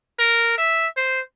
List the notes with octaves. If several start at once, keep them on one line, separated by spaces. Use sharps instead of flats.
A#4
E5
C5